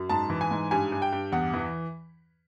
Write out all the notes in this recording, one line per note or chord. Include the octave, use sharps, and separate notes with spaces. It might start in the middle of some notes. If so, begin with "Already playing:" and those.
Already playing: F#2
G#2 A5
E3
G#5
G#2
G2 G#5
G2
G5
G2
E2 F#5
E3